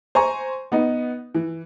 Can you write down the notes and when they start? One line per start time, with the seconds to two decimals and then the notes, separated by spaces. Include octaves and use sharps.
0.15 C5 G#5 A#5 C#6
0.72 B3 D#4
1.35 E3